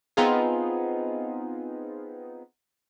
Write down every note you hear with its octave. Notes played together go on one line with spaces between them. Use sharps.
B3 C4 D#4 F4 G#4